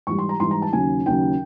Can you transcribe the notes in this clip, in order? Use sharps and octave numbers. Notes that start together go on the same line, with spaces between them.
G#2 E3 G3 C#6
C6
A#5
G#2 E3 G3 C6
A#5
A5
D#2 C#3 F#3 G#5
D#2 C#3 F#3 G5